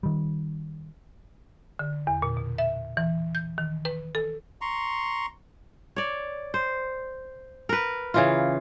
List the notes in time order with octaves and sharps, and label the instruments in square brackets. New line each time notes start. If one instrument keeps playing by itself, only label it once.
[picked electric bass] D#3 G3
[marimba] D3
E2
A#2
B2
E5
E3
G6
D#3
B4
A4
[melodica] A#5 C6 C#6
[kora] C#5 D5
C5
A#4 B4
C#3 E3 F4